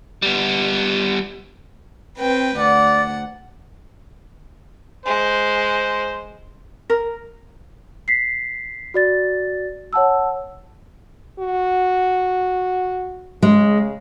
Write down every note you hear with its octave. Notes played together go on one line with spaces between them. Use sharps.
G3 B3
C4 B4 G5
D2 D5 F#5
G#3 C5
A#4
B6 C7
F#4 D5 A6
C#5 F#5 A5 E6
F#4
C#3 G#3